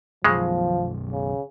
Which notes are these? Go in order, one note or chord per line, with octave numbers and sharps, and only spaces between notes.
B1 F#2 C#3 F3 G#3
C#3